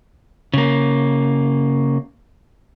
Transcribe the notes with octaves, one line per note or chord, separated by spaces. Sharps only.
C#3 A#3